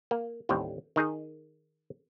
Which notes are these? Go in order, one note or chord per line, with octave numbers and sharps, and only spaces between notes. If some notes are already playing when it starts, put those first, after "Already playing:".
A#3
A1 D#2 A2 G3 C4
D#3 D#4 G#4 D#5